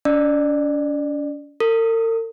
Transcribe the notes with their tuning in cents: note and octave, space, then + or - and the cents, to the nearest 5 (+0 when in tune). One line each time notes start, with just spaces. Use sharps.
D4 -45 D5 +30
A#4 -45 D#6 +0